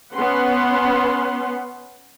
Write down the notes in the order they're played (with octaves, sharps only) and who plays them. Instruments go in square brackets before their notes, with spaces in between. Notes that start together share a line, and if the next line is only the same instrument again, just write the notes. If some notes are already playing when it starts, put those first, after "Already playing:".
[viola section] B3 C#4 B4 F#5 C6